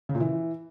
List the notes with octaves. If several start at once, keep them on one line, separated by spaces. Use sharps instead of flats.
C#3
A#2
E3